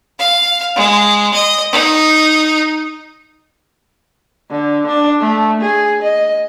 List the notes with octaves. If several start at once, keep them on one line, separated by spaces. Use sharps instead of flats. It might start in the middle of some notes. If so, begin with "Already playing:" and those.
F5
G#3
D#5
D#4
D3
D4
A3
G#4
D#5